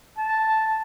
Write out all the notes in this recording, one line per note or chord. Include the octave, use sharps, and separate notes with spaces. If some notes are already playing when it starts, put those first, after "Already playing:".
A5